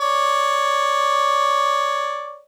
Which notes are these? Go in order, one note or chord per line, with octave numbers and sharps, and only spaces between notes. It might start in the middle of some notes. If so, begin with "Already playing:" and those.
C#5 D5